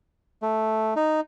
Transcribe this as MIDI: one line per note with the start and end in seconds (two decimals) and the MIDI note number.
0.42 0.94 57
0.96 1.20 63